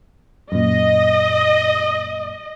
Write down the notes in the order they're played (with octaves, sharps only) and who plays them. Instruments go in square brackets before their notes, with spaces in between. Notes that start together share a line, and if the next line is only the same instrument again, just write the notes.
[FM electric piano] F#2 A#2 [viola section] D#5